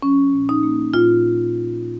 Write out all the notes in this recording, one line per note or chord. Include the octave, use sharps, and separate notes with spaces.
F3 C#4
A#2
D#4
A#3
A#2 F4